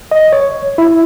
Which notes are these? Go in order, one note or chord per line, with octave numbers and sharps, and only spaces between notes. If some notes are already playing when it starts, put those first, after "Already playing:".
D#5
C#5
E4